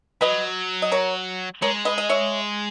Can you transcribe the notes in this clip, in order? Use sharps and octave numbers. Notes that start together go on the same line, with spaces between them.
F#3 B4 D#5
D#5
A#4 C#5
G#3 A#4 C#5
B4 D#5
D#5
C#5 E5